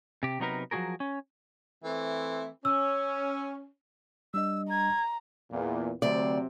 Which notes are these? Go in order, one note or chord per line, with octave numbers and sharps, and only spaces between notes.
C3 G4
C3 F#3 B3 D#4 A#4 B4
F3 F#3 A3 F#4 G#4 A#4
C#4
E3 A3 C4
C#4 E6
G3 D4 D#5 E6
A#5 G#6
E2 A#2
D2 C3 F#3 C4 D5